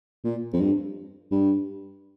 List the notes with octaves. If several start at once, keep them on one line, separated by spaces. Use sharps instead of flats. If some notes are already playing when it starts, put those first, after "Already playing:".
A#2
F2
G2
G2